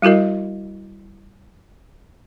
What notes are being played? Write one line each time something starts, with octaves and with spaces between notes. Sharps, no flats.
G3 E4 F#4 A#4 D#5